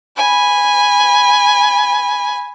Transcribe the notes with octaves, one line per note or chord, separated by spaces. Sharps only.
G#5 B5